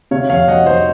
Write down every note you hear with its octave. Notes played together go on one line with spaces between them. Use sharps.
C3 C#5 F5
F2 C#5 F5
F#3 D#5 F#5
F2 C5 D#5